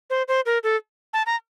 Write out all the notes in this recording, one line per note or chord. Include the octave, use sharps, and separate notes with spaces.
C5
C5
A#4
A4
A5
A#5